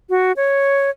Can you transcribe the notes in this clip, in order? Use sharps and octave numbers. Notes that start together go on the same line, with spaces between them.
F#4
C#5